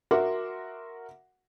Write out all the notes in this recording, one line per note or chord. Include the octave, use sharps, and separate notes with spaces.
F#4 A#4 E5 F#5 C6 D6